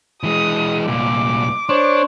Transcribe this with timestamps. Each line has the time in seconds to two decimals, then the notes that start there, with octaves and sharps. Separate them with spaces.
0.23 E3 G#3 D#6
0.87 C2 A#2 D6
1.69 D4 C5 C#5